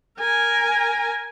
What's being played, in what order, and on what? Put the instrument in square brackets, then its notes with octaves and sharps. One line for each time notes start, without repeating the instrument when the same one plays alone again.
[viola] A#4 G#5